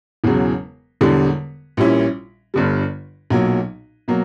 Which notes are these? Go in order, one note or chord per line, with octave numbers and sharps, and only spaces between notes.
E1 E2 C#3 F#3
E1 E2 D3 G3
A#1 A#2 G3 C#4 E4
G1 G2 D3 G3
B1 A#2 F#3
B2 F#3 A#3